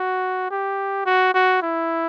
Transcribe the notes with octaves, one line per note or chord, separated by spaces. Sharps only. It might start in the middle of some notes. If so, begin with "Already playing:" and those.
Already playing: F#4
G4
F#4
F#4
E4